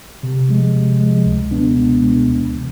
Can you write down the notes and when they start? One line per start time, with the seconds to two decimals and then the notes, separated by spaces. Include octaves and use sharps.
0.23 C3
0.49 F3 G#3
0.74 C3
1.00 F3 G#3
1.26 C#2
1.51 B2 G#3 B3 D4
1.77 C#2
2.03 B2 G#3 B3 D4
2.28 D2
2.54 C3 E3